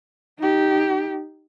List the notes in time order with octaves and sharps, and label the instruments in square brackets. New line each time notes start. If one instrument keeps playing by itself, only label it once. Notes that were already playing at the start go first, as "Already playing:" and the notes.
[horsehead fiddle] D#4 G4